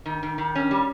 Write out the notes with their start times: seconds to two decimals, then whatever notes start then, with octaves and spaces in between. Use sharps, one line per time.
0.06 D#3
0.23 D#3
0.38 D#3
0.55 C#4
0.71 G3